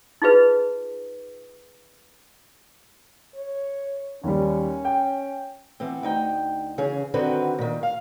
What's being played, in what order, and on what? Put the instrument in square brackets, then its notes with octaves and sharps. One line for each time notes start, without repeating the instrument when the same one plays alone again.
[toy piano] D#4 F4 G#4 B4
[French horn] C#5
[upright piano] D#2 G3 [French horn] C#4
[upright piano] G5
[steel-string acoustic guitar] E3 B3 C4
D2 D#4 G5
C#3 E3 C#4 G#4
D3 D#3 C4 F#4 B4
A#2 D#3
F5